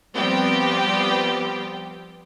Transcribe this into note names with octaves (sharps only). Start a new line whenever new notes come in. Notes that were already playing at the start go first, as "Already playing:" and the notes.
F3 G3 B3 C4 G4